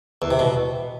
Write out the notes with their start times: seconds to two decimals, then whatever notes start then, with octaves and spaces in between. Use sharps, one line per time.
0.22 E2
0.31 C3
0.39 B2